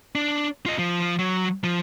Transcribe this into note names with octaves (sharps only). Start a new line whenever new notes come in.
D4
F4 D#5
F3
F#3
F3